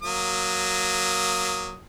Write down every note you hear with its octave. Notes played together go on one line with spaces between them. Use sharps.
F#3 A#3 D#6